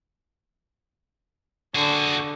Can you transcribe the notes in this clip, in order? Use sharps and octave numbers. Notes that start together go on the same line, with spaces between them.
D3 F#4 G#4